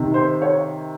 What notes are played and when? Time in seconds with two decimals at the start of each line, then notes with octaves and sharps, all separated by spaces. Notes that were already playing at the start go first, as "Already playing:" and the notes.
Already playing: C3 D#3
0.14 C5
0.42 C#5